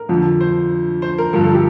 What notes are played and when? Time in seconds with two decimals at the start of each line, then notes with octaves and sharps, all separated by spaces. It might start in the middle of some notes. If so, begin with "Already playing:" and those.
Already playing: A#4
0.09 F2 D3 F3
0.41 C5
1.02 C5
1.18 A#4
1.33 G2 D3 F3 A#4
1.44 A4
1.54 G4